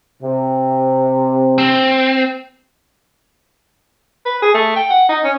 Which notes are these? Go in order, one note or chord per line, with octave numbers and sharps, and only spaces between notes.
C3
C4
B4
G#4
A3
G5
F#5
D#4
C#4